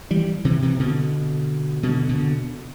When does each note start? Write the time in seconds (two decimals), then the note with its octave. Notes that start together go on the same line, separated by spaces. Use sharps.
0.11 E3 G3
0.45 C3 E3
0.62 C3 E3
0.80 B2 D3
1.83 B2 D3
2.09 B2 D3